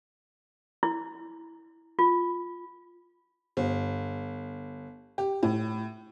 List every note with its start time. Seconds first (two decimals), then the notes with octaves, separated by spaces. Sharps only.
0.83 E4
1.99 F4
3.57 G1
5.18 G4
5.43 A2